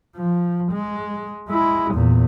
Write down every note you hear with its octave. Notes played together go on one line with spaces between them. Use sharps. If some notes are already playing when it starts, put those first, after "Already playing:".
F3
G#3
G#3 E4
E2 A#2